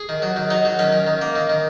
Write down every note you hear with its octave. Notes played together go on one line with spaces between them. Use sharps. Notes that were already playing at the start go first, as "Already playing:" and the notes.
Already playing: G#4
D#3
F#3
D#3
F#3 D#4
F#3
D#3 C#4
D#3
D#3
A#3
D#3
D#3